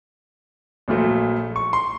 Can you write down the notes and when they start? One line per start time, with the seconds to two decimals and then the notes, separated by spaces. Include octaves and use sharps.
0.88 A#1 A#2 F#3 A3
1.56 C#6
1.73 C6